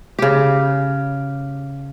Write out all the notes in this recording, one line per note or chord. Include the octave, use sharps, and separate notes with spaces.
C#3 G4